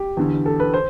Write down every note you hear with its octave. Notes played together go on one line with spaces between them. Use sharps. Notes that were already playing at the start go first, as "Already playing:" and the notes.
Already playing: G4
E2 D3
A4
B4
C5